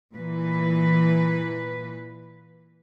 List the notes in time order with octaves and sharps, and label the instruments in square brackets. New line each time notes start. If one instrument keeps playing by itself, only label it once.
[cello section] A#2 E3 B4